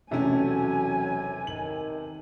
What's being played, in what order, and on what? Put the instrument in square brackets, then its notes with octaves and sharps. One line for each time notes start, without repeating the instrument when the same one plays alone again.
[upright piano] E1 C3 A3 [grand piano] E3 C#4 [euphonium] F#3 [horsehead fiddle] G#5
[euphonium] D#3 [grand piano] F#7